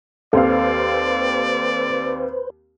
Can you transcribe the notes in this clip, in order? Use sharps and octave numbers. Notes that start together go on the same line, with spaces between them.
D#2 C4 A4 B4 C5 D5 F5